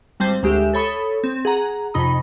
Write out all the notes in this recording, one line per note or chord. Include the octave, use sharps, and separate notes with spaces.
G#1 G3 C4 C5 A5 G6
D2 G#3 G4 E5
A4 C#5 B5 D#6
C4
G#4 F#5 A#5
F2 C3 D#4 B5 D#6